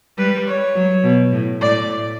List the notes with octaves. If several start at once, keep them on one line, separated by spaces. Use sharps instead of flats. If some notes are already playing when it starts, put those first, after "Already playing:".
G3 B4
C#5
F#3
B2
A2
A2 D5